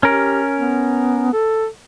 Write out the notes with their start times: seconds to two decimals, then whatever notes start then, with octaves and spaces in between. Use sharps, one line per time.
0.03 C#4 G4 A#4
0.56 B3
1.33 A4